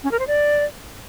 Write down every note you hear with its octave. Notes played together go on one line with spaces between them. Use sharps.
C#4
A#4
C5
D5